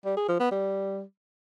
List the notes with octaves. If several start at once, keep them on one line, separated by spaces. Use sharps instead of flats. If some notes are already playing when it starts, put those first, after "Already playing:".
G3
G#4
F3
B3
G3